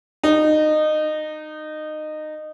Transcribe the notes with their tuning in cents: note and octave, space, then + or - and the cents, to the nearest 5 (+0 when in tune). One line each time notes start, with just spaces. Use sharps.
D#4 -20